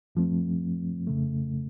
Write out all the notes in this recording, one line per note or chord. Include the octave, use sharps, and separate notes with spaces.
F#2 F3 A3 C4
F2 C#3 A3